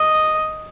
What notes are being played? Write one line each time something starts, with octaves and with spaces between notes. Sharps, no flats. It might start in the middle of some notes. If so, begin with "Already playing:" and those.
Already playing: D#5